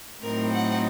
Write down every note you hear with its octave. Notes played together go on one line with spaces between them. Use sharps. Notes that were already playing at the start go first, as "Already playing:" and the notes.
A2 F#3 C4 D#4 A#4
F#5